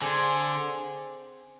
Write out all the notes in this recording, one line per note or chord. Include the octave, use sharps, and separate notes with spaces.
D3 C4 G#4 C5